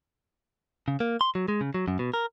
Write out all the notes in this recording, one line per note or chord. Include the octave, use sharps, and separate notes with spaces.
C#3
A#3
C6
F#3
G#3
C#3
F#3
F#2
B2
A#4